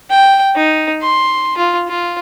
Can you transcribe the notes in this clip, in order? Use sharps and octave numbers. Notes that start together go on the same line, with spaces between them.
G5
D#4
C6
F4
F4